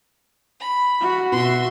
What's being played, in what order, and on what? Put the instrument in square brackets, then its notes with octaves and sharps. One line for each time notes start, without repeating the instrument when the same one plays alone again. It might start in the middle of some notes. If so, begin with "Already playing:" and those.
[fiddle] B5
[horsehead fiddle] F#4
[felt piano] B2 [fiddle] E5 C6